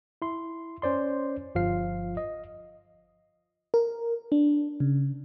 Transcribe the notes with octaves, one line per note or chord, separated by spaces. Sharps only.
E4 C6
C#4 C5 D5 C6
G1 F3 F4 F5 C7
D#5
A#4
D4
C#3